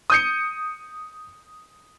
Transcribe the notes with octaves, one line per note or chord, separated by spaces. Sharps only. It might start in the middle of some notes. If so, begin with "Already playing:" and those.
D#6 G6 C#7